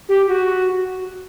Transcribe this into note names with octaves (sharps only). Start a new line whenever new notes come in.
G4
F#4